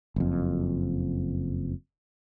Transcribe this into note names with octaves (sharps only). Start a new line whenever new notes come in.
F#1 F2